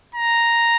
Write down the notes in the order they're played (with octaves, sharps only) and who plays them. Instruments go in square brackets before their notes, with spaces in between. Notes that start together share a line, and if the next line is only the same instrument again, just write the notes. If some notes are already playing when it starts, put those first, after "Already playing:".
[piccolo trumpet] A#5